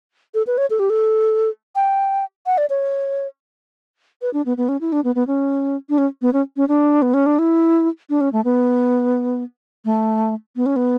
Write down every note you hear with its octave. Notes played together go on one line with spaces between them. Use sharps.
A4
B4
C#5
A4
G4
A4
G5
F#5
D5
C#5
B4
D4
B3
B3
C#4
E4
D4
B3
B3
C#4
D4
C#4
B3
C#4
C#4
D4
B3
C#4
D4
E4
D4
C#4
A3
B3
A3
B3
C#4
B3